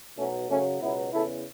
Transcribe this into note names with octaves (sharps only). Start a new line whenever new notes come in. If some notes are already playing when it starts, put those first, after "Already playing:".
B1 B2 F#3 A3 C#4
F#2 C#3 F#3 A3 C#4
C#2 B2 F#3 B3 E4
E2 C#3 E3 E4 A4